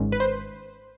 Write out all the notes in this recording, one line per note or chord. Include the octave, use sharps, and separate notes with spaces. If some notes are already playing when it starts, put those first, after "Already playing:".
Already playing: G#1 G#2 D#3 G#3 C#4
B4
C5